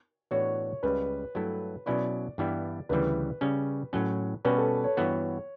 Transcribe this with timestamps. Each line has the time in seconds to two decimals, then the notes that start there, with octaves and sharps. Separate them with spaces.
0.31 A2 E3 B3 D4 F#4 C#5
0.83 C#2 C#3 G3 B4
1.35 G2 F#3 A3 E4 A4
1.86 B2 F#3 C#4 E4 B4 D5
2.38 G2 E3 G3 B3 E4
2.89 D2 C#3 E3 G3 B4
3.41 C#3 G3 C#4
3.93 A2 F#3 C#4
4.45 B2 G3 C#4 F#4 B4
4.58 A4
4.84 C#5
4.97 G2 E3 B3 F#4